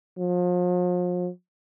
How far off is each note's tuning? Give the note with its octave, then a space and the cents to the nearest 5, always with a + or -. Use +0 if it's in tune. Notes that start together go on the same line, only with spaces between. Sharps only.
F3 +40